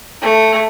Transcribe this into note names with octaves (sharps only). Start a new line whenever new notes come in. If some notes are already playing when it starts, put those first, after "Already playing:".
A3